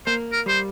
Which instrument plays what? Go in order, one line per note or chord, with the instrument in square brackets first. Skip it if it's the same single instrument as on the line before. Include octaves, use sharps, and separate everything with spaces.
[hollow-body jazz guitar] A#3 [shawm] C5
[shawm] A#4
[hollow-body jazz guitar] G3 [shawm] C5